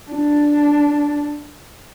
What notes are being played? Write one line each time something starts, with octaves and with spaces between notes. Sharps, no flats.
D4